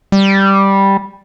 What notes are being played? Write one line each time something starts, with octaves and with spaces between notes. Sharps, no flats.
G3